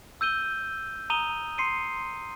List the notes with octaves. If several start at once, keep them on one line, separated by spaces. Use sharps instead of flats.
E6 G6 D#7 G7
A#5 D#6 D#7 F7 G7
C6 C7 C#7 D#7